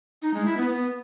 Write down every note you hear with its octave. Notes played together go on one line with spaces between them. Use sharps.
D#4
G#3
E4
B3
B3